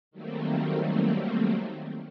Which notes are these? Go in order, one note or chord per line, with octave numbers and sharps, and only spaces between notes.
D#3 F#3 G3 A3 A#3 C4